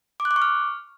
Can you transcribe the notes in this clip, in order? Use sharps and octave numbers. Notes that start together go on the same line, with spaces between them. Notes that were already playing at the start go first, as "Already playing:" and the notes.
D6
F#6
D6
C#6
F6